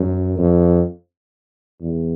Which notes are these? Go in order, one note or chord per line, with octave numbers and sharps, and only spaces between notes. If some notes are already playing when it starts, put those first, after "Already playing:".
Already playing: F#2
F2
E2